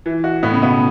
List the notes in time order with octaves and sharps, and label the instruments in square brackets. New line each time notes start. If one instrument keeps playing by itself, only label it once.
[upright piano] E3
F#4
[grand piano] A2 [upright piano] B3
[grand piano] C#3
[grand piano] B2 [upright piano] B3